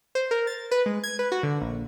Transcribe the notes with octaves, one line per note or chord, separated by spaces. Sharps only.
C5
A#4
A6
B4
G#3
G#6
B4
F#4
D3
A#1